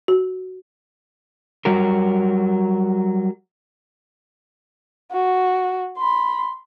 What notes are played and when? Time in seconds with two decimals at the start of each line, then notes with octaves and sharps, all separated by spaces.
0.08 F#4
1.65 F#3 G3 F#4 A#4
5.12 F#4
5.98 B5 C6